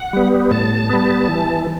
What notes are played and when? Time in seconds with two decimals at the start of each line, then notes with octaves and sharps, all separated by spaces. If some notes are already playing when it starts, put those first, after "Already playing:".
Already playing: F#5
0.13 G3 B3
0.51 A2 A5
0.90 G3 B3
1.28 E3